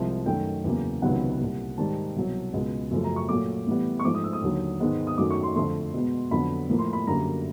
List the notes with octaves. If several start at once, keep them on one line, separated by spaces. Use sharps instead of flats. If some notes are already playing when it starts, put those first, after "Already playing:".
Already playing: C2 C3 F3 G#3
F#2 D#3 F#3 A3 G5
E2 C#3 F#3 A#3
C#2 C3 D#3 F#3 B3 F#5
C2 A#2 G3
G#2 D#3 G3 A5
C2 B2 F#3
C#2 B2 G#3 B3
F#2 C#3 F3 A3
A#5
C#6
A#2 F#3 A3 D6
A2 E3 G3 B3
C#6
G#2 F3 A3 D6
D#6
E6
D#6
D#2 D3 F#3
G#2 D#3 G#3 B3
D#6
F#2 D#3 F#3 A3 D6
C#6
C6
F2 D3 F3 A3 C6
B2 G#3 B3
F2 D3 F#3 B3 B5
A2 F3 A#3
C6
B5
F#2 D3 G3 A#3 A#5